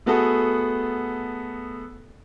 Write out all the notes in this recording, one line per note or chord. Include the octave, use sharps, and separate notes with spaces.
A3 B3 F#4 G#4 A4